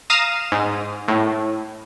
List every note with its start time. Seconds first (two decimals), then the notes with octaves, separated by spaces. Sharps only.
0.10 F5 A#5 D#6 E7
0.52 G#2
1.08 A2